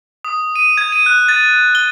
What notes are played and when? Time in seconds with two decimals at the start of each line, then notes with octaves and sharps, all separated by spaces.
0.25 D#6
0.56 D#7
0.78 G#6
0.92 D#7
1.06 F#6
1.28 A6
1.75 G7